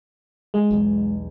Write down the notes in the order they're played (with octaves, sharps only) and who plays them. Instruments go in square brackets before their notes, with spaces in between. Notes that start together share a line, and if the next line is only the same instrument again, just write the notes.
[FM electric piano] G#3
[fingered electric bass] B1 E2